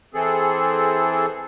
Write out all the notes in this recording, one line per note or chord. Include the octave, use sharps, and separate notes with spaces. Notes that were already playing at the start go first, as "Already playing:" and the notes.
E3 C4 G#4 A4